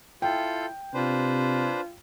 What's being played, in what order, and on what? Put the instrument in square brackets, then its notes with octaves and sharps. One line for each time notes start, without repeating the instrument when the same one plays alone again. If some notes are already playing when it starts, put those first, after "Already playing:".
[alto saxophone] E4 [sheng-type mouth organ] F4 A4 [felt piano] G5
[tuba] C3 [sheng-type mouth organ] D4 B4 C5 [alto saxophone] F4